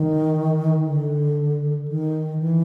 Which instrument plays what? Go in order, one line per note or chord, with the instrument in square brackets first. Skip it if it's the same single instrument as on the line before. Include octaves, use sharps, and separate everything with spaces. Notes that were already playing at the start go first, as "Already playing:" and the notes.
Already playing: [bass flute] D#3
D3
D#3
E3